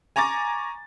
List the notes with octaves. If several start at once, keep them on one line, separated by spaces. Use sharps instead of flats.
G#5 A#5 C#6 D6 A6